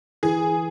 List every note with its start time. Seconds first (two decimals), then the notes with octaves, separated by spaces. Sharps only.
0.23 E3 G#4